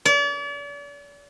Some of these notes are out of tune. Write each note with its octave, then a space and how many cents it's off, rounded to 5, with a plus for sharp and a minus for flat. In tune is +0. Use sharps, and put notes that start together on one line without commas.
D5 -40